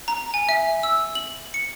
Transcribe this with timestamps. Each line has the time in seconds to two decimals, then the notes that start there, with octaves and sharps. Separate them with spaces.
0.08 A#5
0.34 G#5
0.49 E5
0.83 E6
1.15 F#7
1.54 C#7